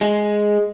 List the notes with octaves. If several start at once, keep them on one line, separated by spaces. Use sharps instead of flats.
G#3